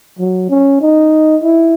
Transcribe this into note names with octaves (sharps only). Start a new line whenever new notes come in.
F#3
C#4
D#4
E4